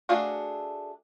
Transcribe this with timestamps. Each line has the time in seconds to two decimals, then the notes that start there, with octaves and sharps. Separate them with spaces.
0.09 A3 D4 F#4 G#4 F5